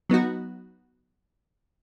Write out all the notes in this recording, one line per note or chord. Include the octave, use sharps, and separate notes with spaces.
F#3 B3 D#4 F#4